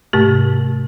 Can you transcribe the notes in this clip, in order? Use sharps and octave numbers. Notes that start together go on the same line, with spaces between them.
G#2 C3 A3 G4